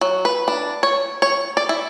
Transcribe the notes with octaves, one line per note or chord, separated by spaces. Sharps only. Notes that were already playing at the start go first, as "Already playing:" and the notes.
F#3
B4
D4
C#5
C#5
D5
E4